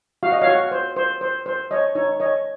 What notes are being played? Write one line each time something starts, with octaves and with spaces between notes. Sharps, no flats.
F#4 F5
D#5
C#5 F5
F#4
C5
C5
C5
C5
C#5 D#5
D#4 C#5
C#5 D#5